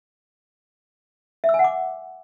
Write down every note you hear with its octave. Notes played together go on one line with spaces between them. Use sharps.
E5
E6
G#5
F#5
D6